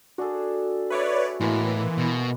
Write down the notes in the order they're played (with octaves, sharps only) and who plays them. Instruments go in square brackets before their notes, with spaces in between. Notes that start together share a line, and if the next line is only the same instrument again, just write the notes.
[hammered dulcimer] D4 G#4 A4 [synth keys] F#4
[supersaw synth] B4 C#5 D5 [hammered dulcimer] E5 C#6
[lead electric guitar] A2 [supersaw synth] E3 [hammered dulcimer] G#3 A#3 B3
[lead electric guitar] B2